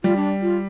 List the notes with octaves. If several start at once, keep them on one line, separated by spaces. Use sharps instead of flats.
G3 F4
D4
F4